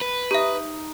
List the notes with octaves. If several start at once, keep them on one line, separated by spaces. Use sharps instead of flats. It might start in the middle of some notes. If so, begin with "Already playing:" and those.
B4
D#4 G4 E5